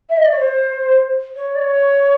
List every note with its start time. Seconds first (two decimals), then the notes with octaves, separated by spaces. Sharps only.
0.09 E5
0.17 D#5
0.24 D5
0.31 C#5
0.39 C5
1.35 C#5
1.55 D5
1.59 C#5